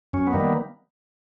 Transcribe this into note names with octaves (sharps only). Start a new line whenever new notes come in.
F#2 C#4
B3
D#3 G3 A#3
B3